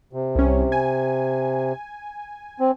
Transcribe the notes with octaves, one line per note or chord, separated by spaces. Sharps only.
C3
C2 C#4
G#5
C4